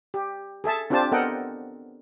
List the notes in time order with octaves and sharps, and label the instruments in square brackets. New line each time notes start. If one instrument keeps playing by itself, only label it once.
[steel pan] G4
G#4 A4 E5 A5
C4 D4 F4 G4 C5 A5
B3 A4 A#4 D#5 F#5 G5